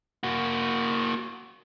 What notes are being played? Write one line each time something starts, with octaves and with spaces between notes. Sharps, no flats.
A#3 F#4